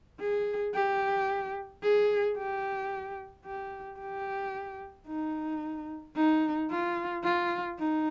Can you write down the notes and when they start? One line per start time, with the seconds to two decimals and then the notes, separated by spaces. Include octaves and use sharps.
0.20 G#4
0.74 G4
1.83 G#4
2.38 G4
3.45 G4
4.00 G4
5.07 D#4
6.16 D#4
6.71 F4
7.24 F4
7.79 D#4